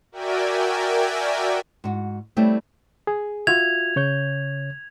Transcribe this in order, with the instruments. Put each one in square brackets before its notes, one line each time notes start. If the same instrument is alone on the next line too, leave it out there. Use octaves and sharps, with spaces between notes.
[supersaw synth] F#4 A#4 D5 E5 G5 G#5
[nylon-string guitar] G#2 F#4
G3 A3 C4 E4 C#5 D5
[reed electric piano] G#4
[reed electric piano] F4 F#4 E5 [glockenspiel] G#6 F7
[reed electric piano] C#3 C#5 G6